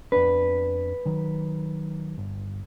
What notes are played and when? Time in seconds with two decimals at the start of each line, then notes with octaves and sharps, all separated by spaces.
0.12 F2 B3 D4 B4
1.06 D#3 F#3
2.18 G1